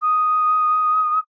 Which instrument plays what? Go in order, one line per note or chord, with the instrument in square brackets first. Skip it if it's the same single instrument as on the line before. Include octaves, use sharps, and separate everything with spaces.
[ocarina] D#6